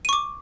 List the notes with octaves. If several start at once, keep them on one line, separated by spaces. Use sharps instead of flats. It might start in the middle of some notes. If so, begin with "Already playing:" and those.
C#6 D6 D#7